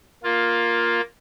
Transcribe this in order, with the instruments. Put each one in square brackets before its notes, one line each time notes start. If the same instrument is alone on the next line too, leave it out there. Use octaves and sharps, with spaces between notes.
[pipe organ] A#3 F4